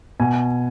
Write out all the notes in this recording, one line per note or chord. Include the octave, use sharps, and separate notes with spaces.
B2 G#5